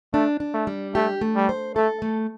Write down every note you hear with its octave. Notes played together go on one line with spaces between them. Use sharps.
A3 D4
D4
A3
G3
A3 G4
A3
G3
C5
A3 A4
A3